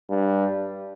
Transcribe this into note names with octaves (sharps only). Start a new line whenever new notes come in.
G2